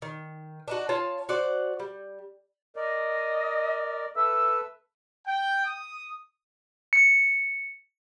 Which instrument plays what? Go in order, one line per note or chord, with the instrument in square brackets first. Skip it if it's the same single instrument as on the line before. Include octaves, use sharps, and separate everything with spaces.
[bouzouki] D#3
D4 D#4 F#4
F4 C#5 F5 A5
F#4 C5 D5 F#5
G3
[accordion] A#4 D5 [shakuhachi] D#5
[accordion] A4 B4 E6 [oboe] E5
[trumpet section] G5
D#6
[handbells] C#7